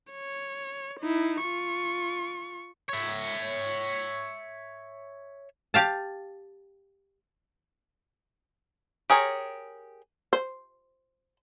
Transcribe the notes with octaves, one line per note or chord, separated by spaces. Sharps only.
C#5
D#4 E4
F4 C#6
C#5 E5
G4 F5 A5
G4 G#4 A#4 C#5
C5